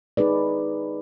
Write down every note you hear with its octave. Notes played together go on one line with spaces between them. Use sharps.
D#4 G#4 B4 D5